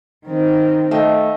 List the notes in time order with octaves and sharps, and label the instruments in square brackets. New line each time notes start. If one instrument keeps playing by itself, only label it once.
[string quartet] D#3 C4
[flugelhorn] A3 [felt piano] D#5 F5 G5